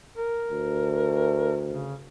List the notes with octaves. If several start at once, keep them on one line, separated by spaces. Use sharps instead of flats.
A#4
D2
C#3